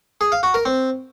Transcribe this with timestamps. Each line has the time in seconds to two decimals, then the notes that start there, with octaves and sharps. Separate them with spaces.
0.21 G#4
0.32 F5
0.43 F#4
0.54 A#4
0.65 C4